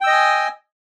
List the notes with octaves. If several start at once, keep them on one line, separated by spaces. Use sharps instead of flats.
D#5 G5 G#5 D#6 E6